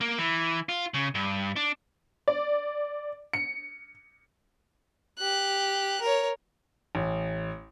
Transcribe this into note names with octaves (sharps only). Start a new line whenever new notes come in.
A#3
E3
F4
C#3
G2
D4
D5
C#7
G4 F#6
A#4 C#5
A1